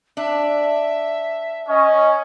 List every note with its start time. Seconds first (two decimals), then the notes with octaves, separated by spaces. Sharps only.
0.17 D4 E5
1.69 C#4 D#5